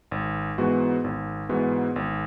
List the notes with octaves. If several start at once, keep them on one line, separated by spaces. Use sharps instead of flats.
G#1
G#2 E3 B3 F#4
G#1
G#2 E3 B3 F#4
G#1